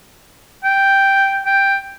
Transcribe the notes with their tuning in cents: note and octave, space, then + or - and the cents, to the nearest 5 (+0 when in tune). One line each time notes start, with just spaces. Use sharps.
G5 +0
G5 +5